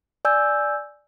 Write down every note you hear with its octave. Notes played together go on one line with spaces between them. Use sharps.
D5 G#5 E6 G6